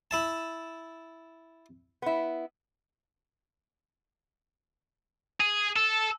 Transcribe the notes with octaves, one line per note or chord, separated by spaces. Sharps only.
E4 E5 A5
B3 E4
G#4
A4